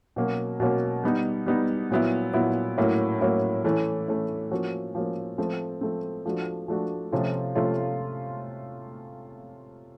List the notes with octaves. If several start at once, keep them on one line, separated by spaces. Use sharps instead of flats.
B2 F#3 A#3 C#4
B2 F#3 A#3 C#4
G3 B3 D#4
G3 B3 D#4
A#2 F#3 B3 E4
A#2 F#3 B3 E4
A2 F#3 A#3 C#4 E4
A2 F#3 A#3 C#4 E4
E3 A3 C#4 E4
E3 A3 C#4 E4
F3 A#3 C#4 F#4
F3 A#3 C#4 F#4
F3 A3 C4
F3 A3 C4
F3 A3 D4 F#4
F3 A3 D4 F#4
C3 F3 A3 C#4 F4
C3 F3 A3 C#4 F4